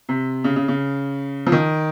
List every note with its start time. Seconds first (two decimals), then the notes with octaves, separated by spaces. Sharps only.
0.09 C3
0.44 C#3
0.56 C#3
0.68 C#3
1.47 F3
1.52 D#3